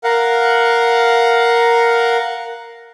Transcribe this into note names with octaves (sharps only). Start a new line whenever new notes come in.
A#4 F5 F#5